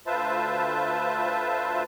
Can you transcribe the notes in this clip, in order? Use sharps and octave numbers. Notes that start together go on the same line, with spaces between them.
D2 F4 B4 C5 E5 A5